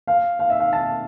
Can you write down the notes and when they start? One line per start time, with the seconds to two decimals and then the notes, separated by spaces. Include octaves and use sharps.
0.07 F5
0.39 F5
0.50 E5
0.60 F5
0.73 A5